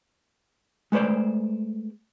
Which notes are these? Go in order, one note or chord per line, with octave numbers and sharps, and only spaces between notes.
G#3 A3 B4 C5 D5